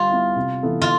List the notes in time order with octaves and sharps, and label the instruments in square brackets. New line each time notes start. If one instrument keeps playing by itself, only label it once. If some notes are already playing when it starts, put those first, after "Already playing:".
Already playing: [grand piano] G3 [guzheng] F4
[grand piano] B3 E4
C3
E3 B3 E4 A4
[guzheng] F4